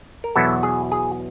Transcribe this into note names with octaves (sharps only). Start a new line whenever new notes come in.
A#4
E2 B2 F#3 B3 E4 A4
G#4
G#4